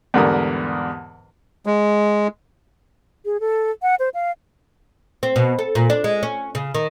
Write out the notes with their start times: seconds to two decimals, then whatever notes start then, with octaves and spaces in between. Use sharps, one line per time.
0.14 E2 G#2 D3 G3 A#4 D#6
1.66 G#3
3.25 G#4
3.40 A4
3.82 F#5
3.99 C5
4.14 F5
5.23 C4
5.36 B2
5.59 A4
5.75 A#2
5.90 D4
6.04 G#3
6.23 C#4
6.55 C#3
6.74 D#3